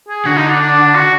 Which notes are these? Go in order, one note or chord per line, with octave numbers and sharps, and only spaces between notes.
G#4
D3 F#4
D#4
D4
D4
F#4